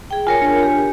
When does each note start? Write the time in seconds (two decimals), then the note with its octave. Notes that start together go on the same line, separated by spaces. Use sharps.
0.11 G#4 G5
0.27 F4 A#4 C#5 G#5
0.42 D4 C#7
0.63 G4